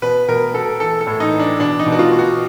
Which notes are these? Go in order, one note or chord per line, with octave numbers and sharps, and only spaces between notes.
B2 B4
B2 A#4
B2 A4
E3 A4
A4
A2
D#4
E3
D4
B2 D4
D#4
B2
F#4
F4
B2
F#4